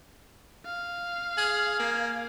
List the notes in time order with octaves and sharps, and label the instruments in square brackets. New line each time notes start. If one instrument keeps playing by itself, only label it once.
[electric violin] F5
[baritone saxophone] G#4
A#3